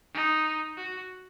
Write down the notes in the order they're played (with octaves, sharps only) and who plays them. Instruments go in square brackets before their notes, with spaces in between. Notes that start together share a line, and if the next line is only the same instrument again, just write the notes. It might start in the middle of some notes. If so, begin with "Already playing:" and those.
[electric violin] D#4
F#4